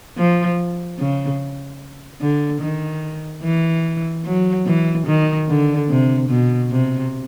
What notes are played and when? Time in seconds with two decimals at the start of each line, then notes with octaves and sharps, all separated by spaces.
0.17 F3
0.99 C#3
2.21 D3
2.62 D#3
3.44 E3
4.25 F#3
4.66 E3
5.07 D#3
5.48 D3
5.89 C3
6.29 B2
6.71 C3